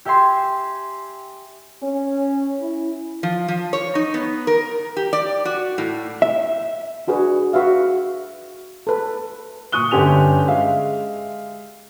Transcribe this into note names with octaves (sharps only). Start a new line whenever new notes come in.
G4 E5 G5 G#5 C6
C#4
E4
F3
F3
C#5
D#4
B3
A#4
G4
D5
F#4
A2
E5
D4 F#4 G#4 B4
F#4 B4 E5 F5
A4 B4
A#2 C#6 D#6 F#6 G7
G1 D3 C#4 G4 G#5 F7
G#3 E5 F5